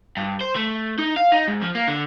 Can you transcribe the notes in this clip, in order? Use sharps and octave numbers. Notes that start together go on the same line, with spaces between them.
G2
C5
A3
D#4
F5
D#4
G#2
F3
A#3
D3